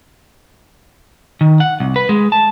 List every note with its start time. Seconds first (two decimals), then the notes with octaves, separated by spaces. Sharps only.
1.41 D#3
1.60 F#5
1.80 C2
1.96 B4
2.09 G#3
2.32 A5